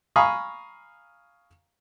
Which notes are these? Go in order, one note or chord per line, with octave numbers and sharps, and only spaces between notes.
F5 G#5 A#5 B5 C#6 D#6